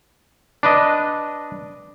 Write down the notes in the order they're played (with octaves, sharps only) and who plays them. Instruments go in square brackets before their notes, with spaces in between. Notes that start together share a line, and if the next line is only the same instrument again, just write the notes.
[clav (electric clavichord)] D4 B4 D#5